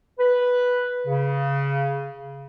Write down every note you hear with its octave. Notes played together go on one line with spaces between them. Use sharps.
B4
C#3